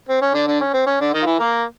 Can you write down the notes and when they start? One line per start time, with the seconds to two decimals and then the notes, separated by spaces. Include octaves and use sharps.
0.09 C4
0.22 C#4
0.34 D3 D4
0.47 D3 D4
0.61 C#4
0.74 C4
0.87 C#4
1.00 D3 D4
1.13 D#3 D#4
1.22 F4
1.26 E3 E4
1.39 A#3 A#4